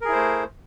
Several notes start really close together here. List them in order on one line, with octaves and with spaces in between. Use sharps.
A#4 G#4 E4 C5 A3